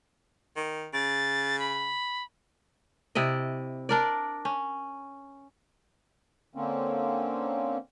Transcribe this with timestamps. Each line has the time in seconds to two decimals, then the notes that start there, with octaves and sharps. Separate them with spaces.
0.56 D#3
0.94 C#3 A6
1.59 B5
3.15 C3 E4 D5 D#5
3.89 D4 A#4 D5
4.45 C#4
6.55 D3 A#3 C4 C#4